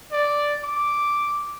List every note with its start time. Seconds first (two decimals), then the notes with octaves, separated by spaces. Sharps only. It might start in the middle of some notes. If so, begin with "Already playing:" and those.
0.12 D5
0.64 D6